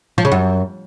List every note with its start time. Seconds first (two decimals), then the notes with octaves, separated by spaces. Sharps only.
0.18 F3
0.25 C#3
0.32 F#2